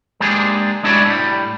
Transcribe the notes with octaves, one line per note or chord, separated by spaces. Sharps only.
G#3 A#3 D4 G4 G#4
G#3 D4 E4 F#4 C#5 D5
A2 G3